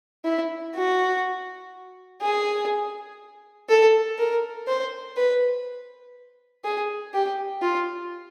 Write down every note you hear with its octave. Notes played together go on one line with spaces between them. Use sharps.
E4
F#4
G#4
A4
A#4
C5
B4
G#4
G4
F4